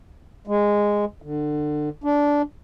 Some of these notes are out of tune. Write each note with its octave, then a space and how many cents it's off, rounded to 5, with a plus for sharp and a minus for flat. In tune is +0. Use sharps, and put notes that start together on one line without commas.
G#3 -10
D3 +25
D4 -15